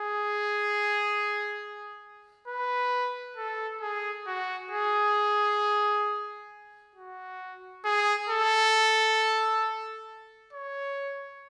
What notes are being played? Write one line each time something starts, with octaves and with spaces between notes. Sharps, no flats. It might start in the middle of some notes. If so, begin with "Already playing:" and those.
Already playing: G#4
B4
A4
G#4
F#4
G#4
F#4
G#4
A4
C#5